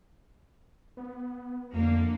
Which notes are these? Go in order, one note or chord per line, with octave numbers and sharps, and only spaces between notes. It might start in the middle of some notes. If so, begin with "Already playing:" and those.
B3
F2 D3 A#3